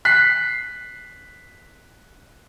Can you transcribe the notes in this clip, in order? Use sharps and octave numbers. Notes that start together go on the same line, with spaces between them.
F#6 B6 C7